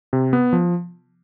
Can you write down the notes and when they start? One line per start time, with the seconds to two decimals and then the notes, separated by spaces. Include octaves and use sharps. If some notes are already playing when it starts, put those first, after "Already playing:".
0.13 C3
0.33 B3
0.53 F3